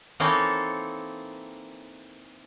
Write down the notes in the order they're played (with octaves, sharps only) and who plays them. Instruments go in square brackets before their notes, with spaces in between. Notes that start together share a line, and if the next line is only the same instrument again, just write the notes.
[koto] E3 A#3 C4 D#4 A4 C#5